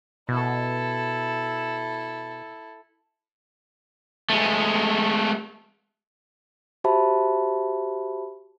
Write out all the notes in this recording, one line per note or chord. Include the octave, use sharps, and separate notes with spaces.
B2 E4 A4
G#3 A3
F#4 G4 C5 E5 A5 B5